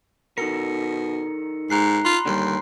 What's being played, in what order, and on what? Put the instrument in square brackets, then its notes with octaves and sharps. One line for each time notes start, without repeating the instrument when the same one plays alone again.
[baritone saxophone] B2 [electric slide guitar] D#4 A4 A#4 [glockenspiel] C#7
[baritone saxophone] G#2 [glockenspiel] A#5 F#6 C7
[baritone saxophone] F4 [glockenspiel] B5 C6
[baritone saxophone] D#2 [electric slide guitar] D3 G3